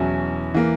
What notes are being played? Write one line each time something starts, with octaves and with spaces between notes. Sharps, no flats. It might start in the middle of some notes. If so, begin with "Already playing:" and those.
Already playing: E2 B2 F#3 C#4 E4
E3 A#3